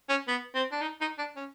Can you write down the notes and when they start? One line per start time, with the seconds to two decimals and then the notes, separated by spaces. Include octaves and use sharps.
0.09 C#4
0.28 B3
0.54 C4
0.71 D4
0.81 D#4
1.01 D#4
1.18 D4
1.36 C#4